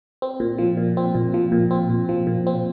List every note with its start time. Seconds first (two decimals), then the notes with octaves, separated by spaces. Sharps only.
0.22 C4
0.40 A#2
0.58 F3
0.77 A#2
0.97 C4
1.15 A#2
1.34 F3
1.52 A#2
1.71 C4
1.90 A#2
2.09 F3
2.27 A#2
2.47 C4